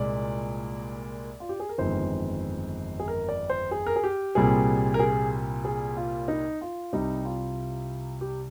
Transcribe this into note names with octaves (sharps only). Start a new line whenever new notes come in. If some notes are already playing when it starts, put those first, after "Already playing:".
Already playing: C2 A#2 G#3 D5
F4
G4
G#4
A#4
G1 F2 D#3 G#3 C5
G#4
A#4
D5
C5
G#4
A#4
G#4
G4
C2 A#2 G3 C4 G#4
A#4
G#4
G#4
F4
D#4
F4
C2 C3 G3 D#4
F4
G4